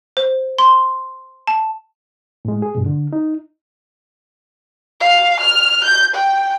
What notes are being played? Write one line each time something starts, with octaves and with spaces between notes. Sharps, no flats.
C5
C6
A5
A2 G#3
G#4
G2 B2
D3
D#4
F5
F6
G6
G5